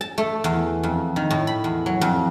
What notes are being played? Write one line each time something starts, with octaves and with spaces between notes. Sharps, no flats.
A5
A3
E2
F2
D#3
A2
B5
E2
F#3
F2